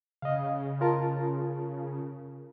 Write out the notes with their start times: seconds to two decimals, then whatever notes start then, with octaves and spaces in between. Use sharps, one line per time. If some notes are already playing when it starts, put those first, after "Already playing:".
0.22 C#3 D#5 F5
0.81 F4 A#4 A5